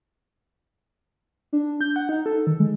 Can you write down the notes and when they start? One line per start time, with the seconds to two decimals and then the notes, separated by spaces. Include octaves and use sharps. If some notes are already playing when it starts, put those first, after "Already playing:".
1.53 D4
1.81 G6
1.96 F#5
2.09 D#4
2.26 A4
2.47 D#3
2.60 G#3